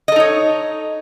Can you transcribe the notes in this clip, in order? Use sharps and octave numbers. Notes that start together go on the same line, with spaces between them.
D#4 A4 C#5 D#5